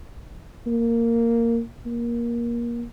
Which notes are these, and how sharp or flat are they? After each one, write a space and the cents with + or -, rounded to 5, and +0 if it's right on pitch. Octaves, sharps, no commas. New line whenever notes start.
A#3 -10
A#3 +20